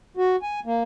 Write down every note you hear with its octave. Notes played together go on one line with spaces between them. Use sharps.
F#4
G#5
A#3